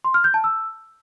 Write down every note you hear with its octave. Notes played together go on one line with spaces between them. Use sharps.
C6
F6
G6
A5
E6